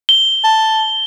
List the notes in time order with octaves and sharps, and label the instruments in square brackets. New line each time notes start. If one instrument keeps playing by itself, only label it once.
[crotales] G7
[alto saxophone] A5